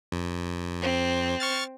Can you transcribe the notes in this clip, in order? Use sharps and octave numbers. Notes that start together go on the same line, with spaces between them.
F2
C4
C#6 F6 A6